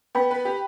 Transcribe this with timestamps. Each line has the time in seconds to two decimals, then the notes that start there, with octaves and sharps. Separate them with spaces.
0.15 B3 G5 B5
0.31 B4
0.45 G4